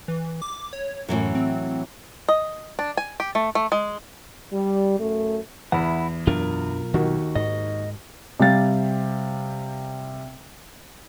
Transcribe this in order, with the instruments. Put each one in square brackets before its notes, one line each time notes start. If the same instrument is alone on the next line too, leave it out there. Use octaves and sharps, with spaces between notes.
[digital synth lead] E3
D6
C#5
[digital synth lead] F#2 [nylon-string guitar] A2 E3 F#3
[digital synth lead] C4
[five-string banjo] D#5
D4
G#5
G4
A3
A3
G#3
[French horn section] G3
F#2 A3
[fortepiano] E2 [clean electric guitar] E4 F#5
[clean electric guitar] B1 F4 A#4 [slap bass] F#2 D4
[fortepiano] D#2 F#4 [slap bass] D#3
[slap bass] G#2 [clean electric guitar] D#5
[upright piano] C3 G3 F5 A6